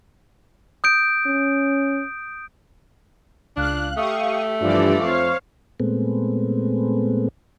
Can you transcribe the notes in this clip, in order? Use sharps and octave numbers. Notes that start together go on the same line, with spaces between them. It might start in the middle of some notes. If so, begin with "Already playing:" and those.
D#6 G6 D7
C#4
C#2 D4 F5 F#6
A3 G4 F5 C#6 D#6
G2 E3 F3 D4 F4 D5
F2 C5 C#5 F5
A#2 G#3 A3 B3 C4